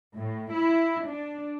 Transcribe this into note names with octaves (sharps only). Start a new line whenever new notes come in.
A2
E4
D4